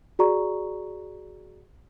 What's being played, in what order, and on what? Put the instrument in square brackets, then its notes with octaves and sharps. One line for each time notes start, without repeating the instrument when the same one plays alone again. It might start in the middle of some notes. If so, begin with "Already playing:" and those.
[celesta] F#4 G#4 D5 A#5 C#6